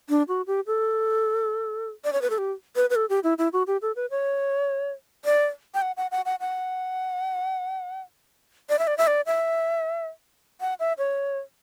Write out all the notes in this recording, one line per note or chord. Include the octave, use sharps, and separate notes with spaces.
D4
F#4
G4
A4
D5
C#5
B4
A4
G4
B4
B4
A4
G4
E4
E4
F#4
G4
A4
B4
C#5
D5
G5
F#5
F#5
F#5
F#5
F#5
D5
E5
D5
E5
D5
E5
F#5
E5
C#5